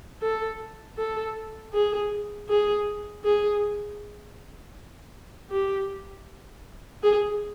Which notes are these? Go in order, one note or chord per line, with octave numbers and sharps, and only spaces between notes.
A4
A4
G#4
G#4
G#4
G4
G#4